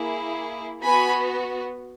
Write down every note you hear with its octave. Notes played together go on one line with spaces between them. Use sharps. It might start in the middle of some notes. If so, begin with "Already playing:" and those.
Already playing: A#3 E4 G#4
B3 F#4 G#5 B5